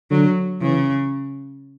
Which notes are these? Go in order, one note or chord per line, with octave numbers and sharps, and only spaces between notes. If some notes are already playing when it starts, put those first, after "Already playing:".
D3 F#3
C#3 E3